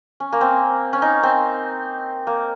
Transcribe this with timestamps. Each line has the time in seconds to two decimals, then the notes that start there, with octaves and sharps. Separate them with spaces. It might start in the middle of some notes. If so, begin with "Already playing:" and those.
0.20 C#4
0.32 A#3
0.41 C4
0.93 C#4
1.02 D#4
1.23 C4
2.27 A#3